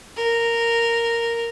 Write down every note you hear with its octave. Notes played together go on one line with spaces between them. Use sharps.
A#4